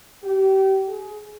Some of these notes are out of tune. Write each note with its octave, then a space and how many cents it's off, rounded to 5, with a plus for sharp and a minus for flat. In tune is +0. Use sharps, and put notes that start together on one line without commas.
G4 -30
G#4 +25